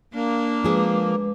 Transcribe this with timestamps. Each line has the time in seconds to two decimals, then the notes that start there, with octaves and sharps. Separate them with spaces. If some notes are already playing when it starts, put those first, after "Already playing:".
0.14 A#3 D4
0.64 F3 G#3 G#4 B4 D6